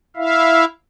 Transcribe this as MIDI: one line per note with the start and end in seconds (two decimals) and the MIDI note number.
0.17 0.65 64
0.17 0.65 76
0.17 0.65 77